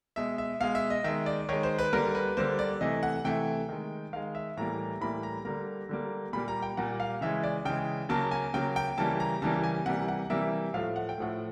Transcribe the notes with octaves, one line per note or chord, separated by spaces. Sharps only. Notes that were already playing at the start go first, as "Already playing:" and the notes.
B2 G#3 E5
E5
B2 G#3 F5
E5
D#5
D#3 G#3 E5
D5
D#3 G#3 C#5
C5
B4
D3 G3 A#3 A#4
B4
D3 G3 A#3 C5
D5
C3 E3 A3 D#5
F#5
C3 E3 A3 G5
D#3 G#3
D#3 G#3 F5
E5
A2 E3 G3 A#3 A#5
A2 E3 G3 A#3 B5
A#5
D3 G3 A#3 A#5
D3 G3 A#3
A#2 G3 A#3 B5
A#5
G5
A#2 G3 A#3 F#5
F5
C#3 E3 G#3 E5
D5
C#3 E3 G#3 G5
C#3 F#3 A#3 A5
G#5
C#3 F#3 A#3 G5
G5
C#3 E3 G3 A#3 A5
A#5
C#3 E3 G3 A#3 A5
G#5
C3 E3 G3 A#3 F#5
F#5
C3 E3 G3 A#3 E5
A2 F3 A3 F5
F#5
G5
A2 F3 A3 F#5